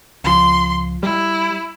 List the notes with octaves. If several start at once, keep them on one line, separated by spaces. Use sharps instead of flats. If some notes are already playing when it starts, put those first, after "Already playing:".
C#2 F3 C6
G3 E4